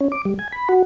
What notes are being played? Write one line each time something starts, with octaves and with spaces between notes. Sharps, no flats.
C#4
D6
G3
G#5
B5
F#4